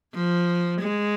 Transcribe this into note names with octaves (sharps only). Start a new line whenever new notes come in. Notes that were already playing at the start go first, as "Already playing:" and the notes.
F3
G#3